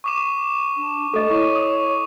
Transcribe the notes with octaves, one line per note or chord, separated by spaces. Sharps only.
C#6 D6 E7
D4
A3 A4 D#5
E4 C#5 C#6
D#6